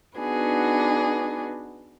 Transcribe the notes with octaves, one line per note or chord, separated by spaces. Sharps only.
B3 D4 D#4 F#4 G#4 B4